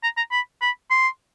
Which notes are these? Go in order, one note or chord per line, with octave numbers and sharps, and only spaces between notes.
A#5
A#5
B5
B5
C6